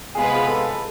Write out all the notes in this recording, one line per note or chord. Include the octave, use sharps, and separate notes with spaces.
C3 G#3 B3 F4 G#4 B4
A4